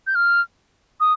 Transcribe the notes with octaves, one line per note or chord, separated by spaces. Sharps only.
G6
F6
D#6